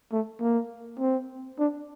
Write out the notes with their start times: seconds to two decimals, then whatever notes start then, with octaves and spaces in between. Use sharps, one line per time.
0.12 A3
0.41 A#3
0.99 C4
1.58 D4